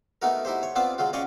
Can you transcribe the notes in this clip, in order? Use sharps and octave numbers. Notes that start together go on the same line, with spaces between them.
A3 B3 D#4 F#4 A#4
D#4 E4 G4 C5
C#5
B3 C4 F4 D5 A5
F#3 G#3 F4 F#4
C#4 D5 D#5 F5 G5 C#6